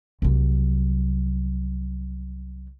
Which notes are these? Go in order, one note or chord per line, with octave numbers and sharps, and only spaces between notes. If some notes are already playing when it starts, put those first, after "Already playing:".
C2 F#3